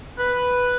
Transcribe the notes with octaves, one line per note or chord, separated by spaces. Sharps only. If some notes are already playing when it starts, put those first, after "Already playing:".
B4